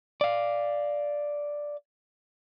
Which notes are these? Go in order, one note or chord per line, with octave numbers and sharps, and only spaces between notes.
D5 F5